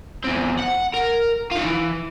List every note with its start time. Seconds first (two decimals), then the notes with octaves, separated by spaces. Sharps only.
0.24 E2 C4
0.59 F#5
0.94 A#4
1.51 D#4 F4
1.65 E3